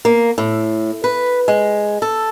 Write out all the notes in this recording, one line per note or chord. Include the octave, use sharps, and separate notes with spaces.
A#3
A2
B4
G#3
A4